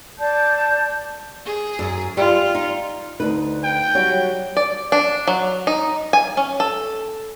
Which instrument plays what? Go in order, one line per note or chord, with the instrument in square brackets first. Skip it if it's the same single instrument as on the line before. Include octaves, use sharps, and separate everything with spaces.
[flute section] D5 A5 G6
[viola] G#4
[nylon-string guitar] F#2
[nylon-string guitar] G3 [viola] F4
[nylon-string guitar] D#4
[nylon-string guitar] D2 B4 [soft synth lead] D#4
[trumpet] G5
[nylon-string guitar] F#3 G3 [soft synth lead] C#5
[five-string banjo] D5
D4
F#3
D#4
G#5
C#4
A4